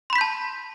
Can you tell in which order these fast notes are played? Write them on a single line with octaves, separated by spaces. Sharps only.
C6 B5 B6 G6 A5